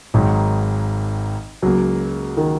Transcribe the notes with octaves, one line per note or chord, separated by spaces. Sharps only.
G#1 G#2 D#3 F#3
C#2 C#3 F#3 A#3
D#3